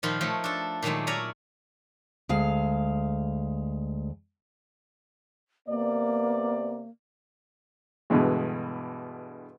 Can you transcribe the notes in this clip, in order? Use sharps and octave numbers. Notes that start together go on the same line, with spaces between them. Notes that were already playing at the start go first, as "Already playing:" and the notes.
A#2 D#3 F3 D#4 F4 B5
F3 A3 C#5
D4 A4
A#2 D#3 F#3 G#3 A3
A#4 C#5 D5 E5 G#5 A#5
D2 G#3 F5
C3 A#3 B3 D5
G2 B2 D3 E3 G#3